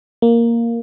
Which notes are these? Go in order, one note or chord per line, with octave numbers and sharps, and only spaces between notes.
A#3